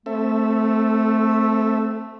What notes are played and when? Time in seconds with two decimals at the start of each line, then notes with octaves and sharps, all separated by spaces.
0.06 A3 C4 A4 E5